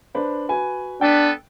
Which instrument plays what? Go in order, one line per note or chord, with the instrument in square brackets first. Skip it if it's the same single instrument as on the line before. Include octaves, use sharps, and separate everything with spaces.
[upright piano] D4 B4 C5
F#4 B4 G#5
[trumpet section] B3 A4 B4 [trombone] D4 [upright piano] G5